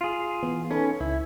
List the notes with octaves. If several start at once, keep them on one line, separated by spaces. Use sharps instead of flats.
F4 G#4
E3 B3
C#4 D#4 A4 B4
C#2 E4